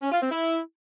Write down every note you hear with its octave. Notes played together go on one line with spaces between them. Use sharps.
C#4
F4
C4
E4